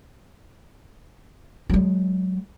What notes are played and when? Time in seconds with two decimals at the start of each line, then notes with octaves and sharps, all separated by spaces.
1.70 F#3 G#3